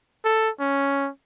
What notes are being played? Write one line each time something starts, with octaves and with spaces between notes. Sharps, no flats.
A4
C#4